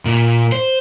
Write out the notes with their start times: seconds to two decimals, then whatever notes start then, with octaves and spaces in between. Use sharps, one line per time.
0.05 A#2
0.52 C5